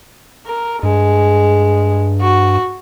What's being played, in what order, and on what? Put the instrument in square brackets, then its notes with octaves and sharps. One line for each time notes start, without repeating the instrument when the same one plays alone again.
[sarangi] A#4
[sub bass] G2 [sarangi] G#3
[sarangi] F#4